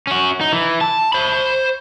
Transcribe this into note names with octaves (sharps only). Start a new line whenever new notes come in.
C#4 F#4
D#4
E3
A5
C5 B5